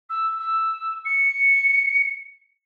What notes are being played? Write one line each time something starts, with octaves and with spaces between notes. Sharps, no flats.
E6
E6
C#7